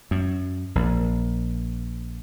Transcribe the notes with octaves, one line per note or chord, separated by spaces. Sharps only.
F#2
A#1